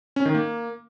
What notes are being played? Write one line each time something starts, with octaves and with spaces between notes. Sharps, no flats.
C#4
D#3
A#3